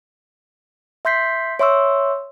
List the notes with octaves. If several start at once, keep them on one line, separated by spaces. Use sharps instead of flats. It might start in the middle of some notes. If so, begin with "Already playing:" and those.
E5 C6 G6 B6 C7
C#5 E5 C6 C#6 E6